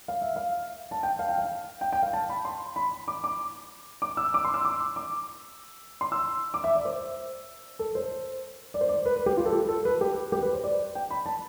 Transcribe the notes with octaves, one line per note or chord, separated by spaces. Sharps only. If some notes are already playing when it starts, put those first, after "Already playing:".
F5
E5
F5
A5
G5
F5
G5
F5
G5
G5
F5
A5
B5
C6
B5
D6
D6
D6
E6
D6
C6
E6
D6
D6
C6
E6
D6
E5
D5
C5
A4
C5
D5
C5
D5
B4
B4
G4
F4
A4
G4
A4
B4
G4
G4
B4
C5
D5
G5
B5
A5